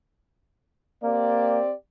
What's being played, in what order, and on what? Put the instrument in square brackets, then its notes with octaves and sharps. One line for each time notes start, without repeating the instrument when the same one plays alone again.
[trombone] A#3 [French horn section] C4 G4 D5